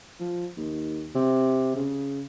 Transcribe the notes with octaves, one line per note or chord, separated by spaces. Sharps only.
F3
D#2
C3
C#3